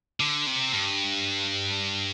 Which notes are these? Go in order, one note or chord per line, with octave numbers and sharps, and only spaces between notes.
D3
C3
G2